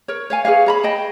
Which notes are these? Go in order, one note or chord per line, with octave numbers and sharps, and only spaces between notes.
A#4 C#5
C#5 F5 G#5
G#4 B4 C#5 F5
G#4 A#5 B5
D#5 G5 A5